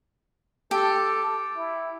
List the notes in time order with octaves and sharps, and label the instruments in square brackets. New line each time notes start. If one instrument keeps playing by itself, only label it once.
[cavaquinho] G4 [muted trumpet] A4
[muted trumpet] E4